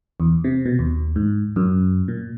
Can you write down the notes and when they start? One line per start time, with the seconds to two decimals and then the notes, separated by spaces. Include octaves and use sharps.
0.20 E2
0.44 C3
0.66 B2
0.79 D#2
1.16 G#2
1.56 F#2
2.08 A#2